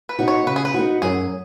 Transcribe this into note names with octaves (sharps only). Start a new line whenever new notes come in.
B4
B3 D#4 F#4
C#5
C#3 B4
G#4
B4
B3 D#4 F#4
F#2 G#4